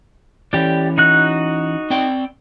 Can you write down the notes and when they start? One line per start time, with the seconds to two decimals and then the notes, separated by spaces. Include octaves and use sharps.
0.53 E3 C#4 G4 D5
0.98 D#4 F#4 F#6
1.90 C4 D5 G5